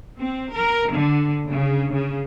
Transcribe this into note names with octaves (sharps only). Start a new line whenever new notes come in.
C4
A#4
D3
C#3
C#3